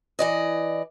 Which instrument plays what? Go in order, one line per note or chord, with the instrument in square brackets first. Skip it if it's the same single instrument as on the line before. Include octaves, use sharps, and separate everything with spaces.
[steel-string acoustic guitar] E3 D5 D#5